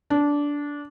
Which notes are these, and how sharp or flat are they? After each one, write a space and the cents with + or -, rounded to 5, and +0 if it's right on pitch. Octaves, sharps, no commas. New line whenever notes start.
D4 -15